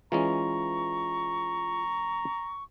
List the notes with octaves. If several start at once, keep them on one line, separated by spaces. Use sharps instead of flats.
E3 G#3 C#4 F4 A#5 C#6